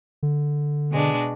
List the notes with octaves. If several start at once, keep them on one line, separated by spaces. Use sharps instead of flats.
D3
B2 G#3 D4